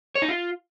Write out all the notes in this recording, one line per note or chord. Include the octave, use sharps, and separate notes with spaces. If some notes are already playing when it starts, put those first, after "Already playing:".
C#5
D#4
F4